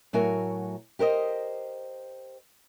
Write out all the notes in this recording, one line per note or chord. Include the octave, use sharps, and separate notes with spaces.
A2 F#3 F#4 A#4 G#5
G4 A#4 C5 D#5